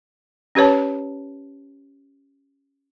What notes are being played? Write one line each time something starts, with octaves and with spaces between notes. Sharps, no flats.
C#4 G4 B4 C#5 A5